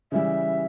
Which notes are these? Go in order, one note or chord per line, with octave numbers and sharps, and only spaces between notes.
C#3 E3 G3 E5